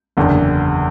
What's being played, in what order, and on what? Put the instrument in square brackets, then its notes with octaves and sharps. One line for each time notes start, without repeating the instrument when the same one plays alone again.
[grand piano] F#1 E2 D3